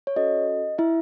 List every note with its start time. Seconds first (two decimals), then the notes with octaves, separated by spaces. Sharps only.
0.07 C#5
0.16 C#4 F#4 A4 D#5
0.78 E4 E5